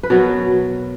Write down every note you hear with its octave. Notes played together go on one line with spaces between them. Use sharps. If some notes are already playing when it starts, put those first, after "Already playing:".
B4
B2 F#3 A#4